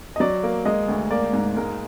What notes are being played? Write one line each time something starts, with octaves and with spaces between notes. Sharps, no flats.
D#5
F#3 D5
A#3
G#3 D#5
D2
A#3 D5
G#2
G#3 A#4